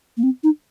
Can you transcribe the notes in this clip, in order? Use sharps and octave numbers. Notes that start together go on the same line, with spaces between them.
A#3
C4
D#4